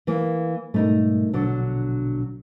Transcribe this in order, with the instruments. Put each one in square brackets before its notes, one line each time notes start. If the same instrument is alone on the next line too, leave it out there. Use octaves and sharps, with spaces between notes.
[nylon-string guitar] E3 A#3
[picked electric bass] G#2 B2 G3 [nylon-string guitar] A3 D#4 A#4
[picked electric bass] A#1 B2 [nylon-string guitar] D3 F#3 D4